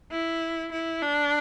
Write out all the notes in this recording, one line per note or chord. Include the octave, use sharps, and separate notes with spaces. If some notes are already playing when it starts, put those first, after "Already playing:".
E4
E4
D4